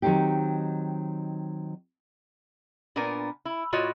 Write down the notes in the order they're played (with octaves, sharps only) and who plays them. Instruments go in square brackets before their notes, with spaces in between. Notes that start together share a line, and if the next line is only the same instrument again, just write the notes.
[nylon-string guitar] D#3 F#3 A#3 C4 D#4 G4
[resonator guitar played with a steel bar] A#2 B3 D4 A#4 G#5
E4
A2 F4 F#4 C#5 D#5